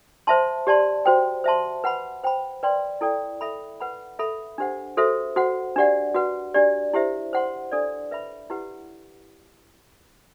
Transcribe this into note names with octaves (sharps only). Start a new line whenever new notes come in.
C5 E5 A5 C6
G4 D5 A5 C6
F#4 C5 G5
C5 E5 A5 C6
B4 F#5 B5
C5 G5 B5
B4 D5 G5 C6
E4 A4 D5 G5
A4 E5 B5
B4 F#5 B5
A4 E5 B5
D4 G4 C5 F#5
F#4 A4 C5 E5
F#4 C5 F#5
D4 G4 D5 F#5
F#4 B4 F#5
D4 G4 D5
E4 G4 C5 E5
C5 F#5 C6
D4 A4 D5
B4 E5 B5
E4 G4 B4 F#5